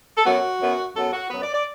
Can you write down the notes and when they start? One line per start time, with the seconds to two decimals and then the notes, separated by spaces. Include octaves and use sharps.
0.17 A4
0.25 F#2 F#3 B3 F#4
0.60 F#2 F#3 B3
0.94 F#2 F#3 B3 A4
1.12 F#4
1.29 F#2 F#3 B3 B4
1.41 D5
1.53 D5